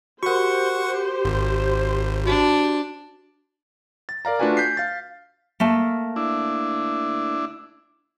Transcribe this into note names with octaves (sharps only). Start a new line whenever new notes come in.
F#4 G4 A#4 C5 F#5 C#6
G#1
D4 F#4
A6
A#4 D5 F5 A#5
A3 D4 F4 F#4 B4 G#5
G6 B6 C7
F5 A6
A3 A#3 A5
D4 E4